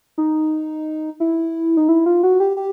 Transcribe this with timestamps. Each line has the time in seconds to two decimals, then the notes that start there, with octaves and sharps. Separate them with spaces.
0.18 D#4
1.20 E4
1.77 D#4
1.89 E4
2.06 F4
2.23 F#4
2.40 G4
2.57 G4